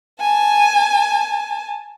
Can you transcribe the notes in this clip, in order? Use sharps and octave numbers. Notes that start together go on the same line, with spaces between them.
G#5 A5